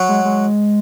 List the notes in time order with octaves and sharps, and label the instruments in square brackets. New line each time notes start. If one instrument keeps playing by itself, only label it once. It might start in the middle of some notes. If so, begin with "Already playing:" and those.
Already playing: [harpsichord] F#3
[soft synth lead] G#3
G#3